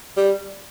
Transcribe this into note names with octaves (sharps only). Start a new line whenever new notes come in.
G3